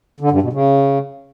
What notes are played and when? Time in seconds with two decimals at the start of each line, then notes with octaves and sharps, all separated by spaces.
0.20 D3
0.31 G2
0.42 B2
0.53 C#3